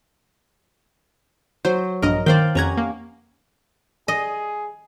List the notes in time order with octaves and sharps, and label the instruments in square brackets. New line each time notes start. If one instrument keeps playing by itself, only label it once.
[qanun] F#3 [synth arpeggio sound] C5
[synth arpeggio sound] A#1 G2 D#5 [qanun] A#4
[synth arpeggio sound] D#3 C5 [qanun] D5 F5 G5
[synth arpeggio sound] F2 A#5 G#6 [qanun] C#4 G4 F#5
[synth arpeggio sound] A#3
[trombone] G#4 [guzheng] D#5